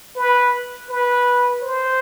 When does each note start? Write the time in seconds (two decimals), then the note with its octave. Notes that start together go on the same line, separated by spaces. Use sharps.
0.16 B4
0.90 B4
1.62 C5